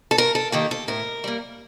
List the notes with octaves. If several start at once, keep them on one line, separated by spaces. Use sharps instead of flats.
A4
G2 A#4
A4
D#3 A#3 G4
A4
A2 A#4
G3 A#3